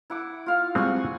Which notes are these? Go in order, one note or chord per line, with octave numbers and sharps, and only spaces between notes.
E4 F#5 D6
F4 F5
G3 G#3 C4 F#5 G#5 C#6